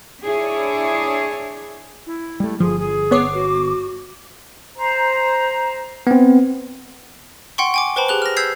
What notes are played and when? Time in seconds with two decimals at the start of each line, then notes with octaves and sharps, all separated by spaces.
0.24 D4 E4 G#4 C#5
2.06 E4
2.40 G3 A3
2.60 G1 F3 G#4
2.79 G#4
3.11 B3 C#5 D6 C7
3.34 F#4
4.75 C5 A#5
6.07 B3 C4
7.58 F#5 G5 C6 C#6
7.74 G5 G#5 D6
7.96 B4 C5 G5 A5 B5
8.08 G4 G#4 F#6 G7
8.22 F6 A#6
8.37 E6 G6 G#6 B6 C7